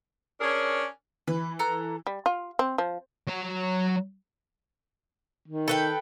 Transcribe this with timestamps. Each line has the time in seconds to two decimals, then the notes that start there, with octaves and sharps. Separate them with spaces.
0.40 C#4 D4 G#4 A#4 C#5
1.28 E3 B4
1.59 A4 A#5 F#6
2.07 G3
2.26 F4
2.59 C4
2.78 F3
3.28 F#3 C#5
5.48 D#3
5.68 A4 B4 G5